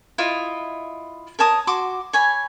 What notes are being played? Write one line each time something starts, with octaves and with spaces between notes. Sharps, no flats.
E4 F4 D#5
A#4 C#5 A5 D#6
F#4 C6 D6
C#5 G#5 B5